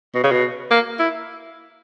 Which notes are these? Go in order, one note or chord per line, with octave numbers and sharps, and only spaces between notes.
B2
C#3
B2
A#3
E4